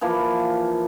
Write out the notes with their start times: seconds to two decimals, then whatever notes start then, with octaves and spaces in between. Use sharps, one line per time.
0.01 E3 F3 A#3